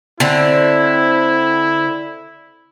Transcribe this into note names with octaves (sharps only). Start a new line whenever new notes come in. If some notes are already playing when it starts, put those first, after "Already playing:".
D3 C4 E4